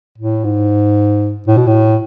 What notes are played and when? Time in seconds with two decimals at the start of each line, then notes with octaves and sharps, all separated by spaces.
0.18 A2
0.44 G#2
1.47 A2
1.57 B2
1.67 A2